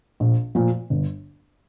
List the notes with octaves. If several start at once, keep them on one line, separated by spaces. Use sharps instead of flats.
A#1
A#2 F3
G1